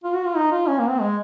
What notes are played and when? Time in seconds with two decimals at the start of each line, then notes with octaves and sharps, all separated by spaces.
0.04 F4
0.15 F#4
0.25 F4
0.36 D#4
0.52 F4
0.68 C#4
0.79 A#3
0.90 C4
1.00 G#3